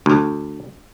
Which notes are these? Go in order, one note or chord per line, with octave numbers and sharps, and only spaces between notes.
D2